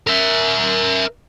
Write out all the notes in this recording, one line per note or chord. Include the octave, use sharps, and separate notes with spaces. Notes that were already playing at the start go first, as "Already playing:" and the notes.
A#4 E5